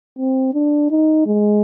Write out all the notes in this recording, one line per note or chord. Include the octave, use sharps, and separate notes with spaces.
C4
D4
D#4
G#3